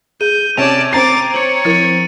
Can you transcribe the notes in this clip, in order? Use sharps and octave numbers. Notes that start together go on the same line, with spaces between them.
G#4 G6 D#7
C3 C#4 D5 A5 G#6 D7 F7
C4 A#5 D6 A6 C7
C#5 C#7 F#7
F3 E4 A#4 A6 C#7 D#7